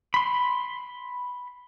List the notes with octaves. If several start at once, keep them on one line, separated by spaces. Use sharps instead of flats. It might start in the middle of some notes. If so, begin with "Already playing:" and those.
B5 C6